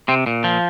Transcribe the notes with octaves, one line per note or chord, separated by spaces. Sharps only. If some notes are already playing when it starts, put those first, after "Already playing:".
C3 C4
A#2
F3